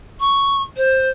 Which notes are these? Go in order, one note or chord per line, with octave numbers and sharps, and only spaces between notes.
C#6
C5